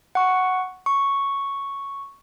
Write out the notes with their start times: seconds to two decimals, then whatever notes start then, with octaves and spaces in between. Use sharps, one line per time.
0.15 F#5 C#6
0.86 C#6